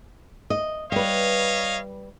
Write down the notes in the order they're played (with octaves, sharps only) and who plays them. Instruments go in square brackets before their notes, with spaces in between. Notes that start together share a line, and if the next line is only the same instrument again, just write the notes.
[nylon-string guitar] D#5
[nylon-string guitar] G3 B4 [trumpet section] C#5 D#5 F5